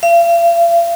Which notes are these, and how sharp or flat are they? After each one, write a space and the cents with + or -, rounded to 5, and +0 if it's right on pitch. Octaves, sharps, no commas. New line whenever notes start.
F5 -45